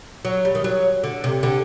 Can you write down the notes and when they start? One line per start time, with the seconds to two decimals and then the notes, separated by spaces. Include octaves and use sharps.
0.25 F#3
0.45 G3
0.55 D#3
0.64 F#3
1.04 D3
1.24 C3
1.43 D3